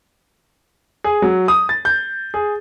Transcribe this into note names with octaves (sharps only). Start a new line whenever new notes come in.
G#4
F#3
D#6
A6
G6
G#4